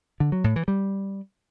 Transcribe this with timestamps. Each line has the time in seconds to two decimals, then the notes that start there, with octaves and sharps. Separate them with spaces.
0.20 D3
0.32 F#3
0.44 A2
0.56 E3
0.68 G3